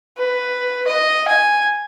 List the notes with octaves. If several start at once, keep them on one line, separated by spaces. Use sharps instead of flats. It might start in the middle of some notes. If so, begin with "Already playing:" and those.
B4
D#5
G#5